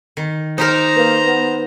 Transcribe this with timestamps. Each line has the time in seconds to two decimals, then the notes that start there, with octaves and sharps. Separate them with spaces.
0.17 D#3
0.58 D#4 G4 A#4 C5 A#5
0.97 A#3 B4
1.26 B3